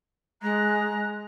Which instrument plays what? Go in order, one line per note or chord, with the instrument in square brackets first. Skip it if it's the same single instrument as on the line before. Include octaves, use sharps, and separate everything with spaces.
[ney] G#3 [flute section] A#5 F#6